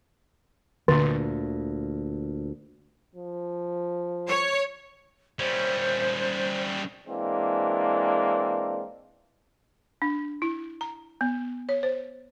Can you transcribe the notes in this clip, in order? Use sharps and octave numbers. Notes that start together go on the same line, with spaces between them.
D2 A#2 D3
F3
C#5
G3 C#4 C5
E3 G#3 A#3 C4 D4
D4
E4
A#5
B3
C#5
C5